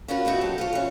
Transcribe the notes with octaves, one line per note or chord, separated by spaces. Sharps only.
C#4 F4 F#4 A#4 B4
D#2 B3 D#4 F#4 E5
F#3 G4 A4 C#5
F4 A4 C#5
E3 C#4